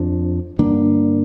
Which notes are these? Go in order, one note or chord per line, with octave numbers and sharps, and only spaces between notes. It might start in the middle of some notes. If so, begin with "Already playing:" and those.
Already playing: F2 F3 D4
G2 D3 A#3 D4